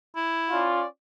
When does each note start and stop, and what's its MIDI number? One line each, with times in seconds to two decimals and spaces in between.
0.16 0.69 64
0.51 0.85 61
0.51 0.85 65
0.51 0.85 74